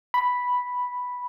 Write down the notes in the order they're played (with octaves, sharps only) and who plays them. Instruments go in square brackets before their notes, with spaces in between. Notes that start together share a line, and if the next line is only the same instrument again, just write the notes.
[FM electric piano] B5